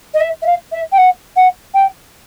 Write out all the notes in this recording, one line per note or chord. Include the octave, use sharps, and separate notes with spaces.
D#5
E5
E5
F5
E5
G5
F#5
F#5
G5